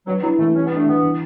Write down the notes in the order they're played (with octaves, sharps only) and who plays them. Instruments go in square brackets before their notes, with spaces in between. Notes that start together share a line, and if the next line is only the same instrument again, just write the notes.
[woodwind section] F#3 [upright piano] B3
[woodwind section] F#3 [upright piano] E4
[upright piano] E3 [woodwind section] A3
[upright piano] G3 [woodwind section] C#4
[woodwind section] B3 [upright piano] D4
[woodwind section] A3
[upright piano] E3 [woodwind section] B3
[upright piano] E3